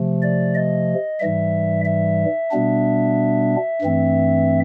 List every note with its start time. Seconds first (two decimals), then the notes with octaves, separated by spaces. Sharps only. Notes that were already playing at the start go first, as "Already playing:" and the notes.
Already playing: C3 F3 A3
0.22 D5
0.55 D#5
1.20 G#2 E3 G3 E5
1.85 E5
2.51 B2 G3 B3 D4
3.82 G2 E3 A3 C4